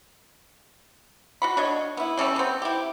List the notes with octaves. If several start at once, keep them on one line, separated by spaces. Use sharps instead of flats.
F#4 F#5 B5
D4 C#5 D#5
B3 E4
C#3 G3 C#4 A4
B3 C4
E4 G4